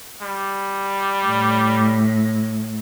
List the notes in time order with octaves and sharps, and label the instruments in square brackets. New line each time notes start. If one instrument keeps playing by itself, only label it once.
[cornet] G3
[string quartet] A2